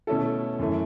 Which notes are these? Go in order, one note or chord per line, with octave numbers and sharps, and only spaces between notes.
B2 A3 C#4 E4 A4
F#2 E3 A3